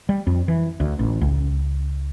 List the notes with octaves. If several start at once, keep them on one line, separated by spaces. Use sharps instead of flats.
G3
F2
E3
D2
A1
C#2